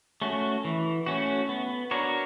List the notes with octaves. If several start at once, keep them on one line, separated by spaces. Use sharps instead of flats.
A3 C#4 F#4
E3
A3 C#4 F#4
B3
D4 F#4 A#4 C#5